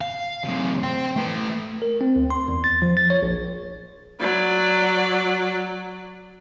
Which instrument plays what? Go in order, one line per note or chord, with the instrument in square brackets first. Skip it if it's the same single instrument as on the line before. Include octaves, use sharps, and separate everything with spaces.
[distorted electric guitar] F5
F#2 C3
C5 G5
A3 B4
[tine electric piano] A#4
C4
D2
C6
E2
A6
F3
A6
C#5
A#1
[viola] F#3 D5